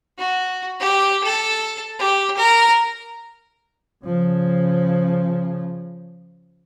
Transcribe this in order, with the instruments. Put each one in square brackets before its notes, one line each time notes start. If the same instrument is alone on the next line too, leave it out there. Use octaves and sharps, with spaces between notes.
[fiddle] F#4
G4
A4
G4
A#4
[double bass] C#3 F3